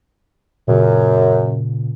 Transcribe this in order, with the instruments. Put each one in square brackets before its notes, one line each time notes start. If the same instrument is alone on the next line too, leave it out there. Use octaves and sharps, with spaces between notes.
[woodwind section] F#2 [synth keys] A#2 C#3